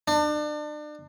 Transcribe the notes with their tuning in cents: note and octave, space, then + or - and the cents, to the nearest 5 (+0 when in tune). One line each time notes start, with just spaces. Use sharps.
D4 +35